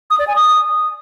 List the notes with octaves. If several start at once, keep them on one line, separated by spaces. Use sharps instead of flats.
D#6
D5
G#5
D#6